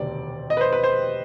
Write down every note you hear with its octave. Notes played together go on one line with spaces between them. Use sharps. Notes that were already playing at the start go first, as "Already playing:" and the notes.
Already playing: E1 D2 C3 D#3 D5
D#5
B4
C5
B4
C5